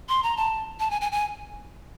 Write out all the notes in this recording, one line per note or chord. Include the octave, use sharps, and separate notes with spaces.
C6
A#5
A5
A5
G#5
G#5
G#5